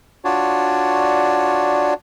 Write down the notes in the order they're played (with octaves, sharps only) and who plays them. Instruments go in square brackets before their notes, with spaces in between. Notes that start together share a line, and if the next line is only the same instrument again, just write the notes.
[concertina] D4 F4 F#4 C#5 D5